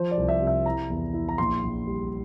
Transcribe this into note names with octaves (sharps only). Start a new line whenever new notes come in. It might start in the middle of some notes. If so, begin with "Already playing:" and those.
Already playing: F3 C5
D5
C2
E5
C3
E5
E4 A#5
E2
E4
A#5
A#1 C6
A#1
G3